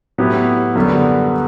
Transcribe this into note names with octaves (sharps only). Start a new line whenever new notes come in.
A2 F#3 B3 E4 G4
F#2 D3 G3 B3